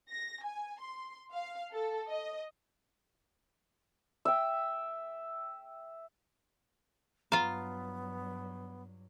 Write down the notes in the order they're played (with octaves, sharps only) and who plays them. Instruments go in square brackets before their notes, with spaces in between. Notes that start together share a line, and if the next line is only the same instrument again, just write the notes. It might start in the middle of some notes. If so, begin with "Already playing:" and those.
[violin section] A#6
G#5
C6
F5
A4
D#5
[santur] E5 G5
[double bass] G2 F#3 [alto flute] B3 [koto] F4 F5 [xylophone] A#5